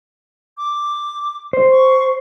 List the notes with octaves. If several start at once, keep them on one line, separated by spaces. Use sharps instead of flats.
D6
C5
C#6